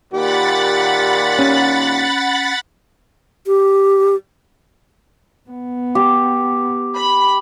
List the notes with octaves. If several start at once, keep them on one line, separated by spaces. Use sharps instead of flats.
D#2 A#2 G4 F#5 B5 A6
C#4
G4
B3
G4
B5